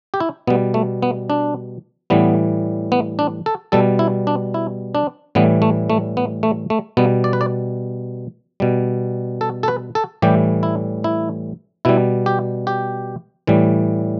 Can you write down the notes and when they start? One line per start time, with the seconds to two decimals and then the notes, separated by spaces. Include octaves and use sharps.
0.14 G4
0.20 E4
0.47 B2 G3 B3
0.74 A3
1.02 B3
1.30 D4
2.10 A2 E3 G3 B3
2.92 B3
3.19 D4
3.46 A4
3.72 B2 G3 A4
3.99 E4
4.27 D4
4.54 E4
4.95 D4
5.35 A2 E3 G3 B3
5.62 A3
5.90 A3
6.17 B3
6.43 A3
6.70 A3
6.97 B2 G3 B3
7.24 D5
7.33 B4
7.41 D5
8.60 B2 G3
9.41 A4
9.63 A4
9.68 B4
9.95 A4
10.22 A2 E3 G3 G4
10.63 E4
11.04 E4
11.85 B2 G3 E4
12.26 G4
12.67 G4
13.47 A2 E3 G3